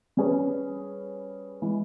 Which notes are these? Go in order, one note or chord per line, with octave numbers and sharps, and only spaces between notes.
G3 C#4 G#4 B4
E3 G#3